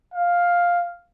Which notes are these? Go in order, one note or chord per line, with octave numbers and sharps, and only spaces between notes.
F5